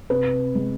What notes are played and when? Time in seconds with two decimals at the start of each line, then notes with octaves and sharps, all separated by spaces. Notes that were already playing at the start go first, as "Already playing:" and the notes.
0.10 C3 B4
0.55 G#3